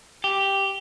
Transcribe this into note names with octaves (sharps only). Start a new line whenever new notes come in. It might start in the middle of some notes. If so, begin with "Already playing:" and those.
G4